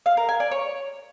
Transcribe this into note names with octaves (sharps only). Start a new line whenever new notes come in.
F5
A#4
G#5
D5
C#5